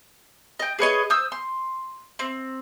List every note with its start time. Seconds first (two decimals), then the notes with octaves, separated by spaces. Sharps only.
0.59 D#5 G5
0.79 G#4 B4 C#5 D#5
1.10 C5 D#6 E6 G6
1.32 C6
2.19 C4